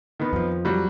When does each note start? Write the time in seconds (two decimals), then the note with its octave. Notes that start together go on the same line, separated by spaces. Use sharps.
0.20 D#3 B3
0.33 F2 F3
0.65 F#3 G3